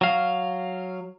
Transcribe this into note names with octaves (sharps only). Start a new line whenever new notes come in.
F#3 F5